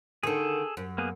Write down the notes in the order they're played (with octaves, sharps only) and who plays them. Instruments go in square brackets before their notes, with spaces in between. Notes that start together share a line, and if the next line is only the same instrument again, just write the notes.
[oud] D3 D#3 [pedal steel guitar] G#4 A4
[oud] F#2
[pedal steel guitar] A#3 B3 G#4